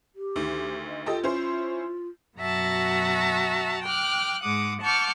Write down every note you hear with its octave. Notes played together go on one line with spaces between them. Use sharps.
G4
D2 D#3
D#5
F4 G4 A4 D#5
C#4 E4 C5
F#2 B2 F#4 E5 A5 A#5
G5 D6 F6 F#6
G#2 G#3 F#5 D6 D#6
F#5 A5 C#6 D6 F6 G6